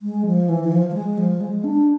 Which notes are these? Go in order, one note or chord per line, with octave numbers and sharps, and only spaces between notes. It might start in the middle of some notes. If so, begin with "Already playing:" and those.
G#3
F3
E3
E3
F3
F3
G#3
F3
G#3
D4